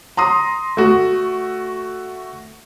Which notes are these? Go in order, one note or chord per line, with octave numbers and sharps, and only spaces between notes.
A#5 C6 D#6
A3 F#4